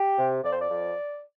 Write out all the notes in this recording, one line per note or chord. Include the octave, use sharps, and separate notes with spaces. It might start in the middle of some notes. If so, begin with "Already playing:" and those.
Already playing: G4
C3
F2 D5
C5
D5
F2